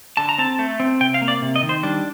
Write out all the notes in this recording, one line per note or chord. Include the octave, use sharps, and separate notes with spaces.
D3 A5
A#5
C4 A5
A3
C4
C3 G5
F5
A#3
D5
C3
D#5
D#3
C5
G3 D4